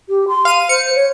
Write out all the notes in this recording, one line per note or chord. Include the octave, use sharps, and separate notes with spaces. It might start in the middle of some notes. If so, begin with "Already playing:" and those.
G4
C6
F5 D#7
C5 C#7
C#5